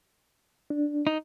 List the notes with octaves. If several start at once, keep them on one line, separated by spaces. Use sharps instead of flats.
D4
D#4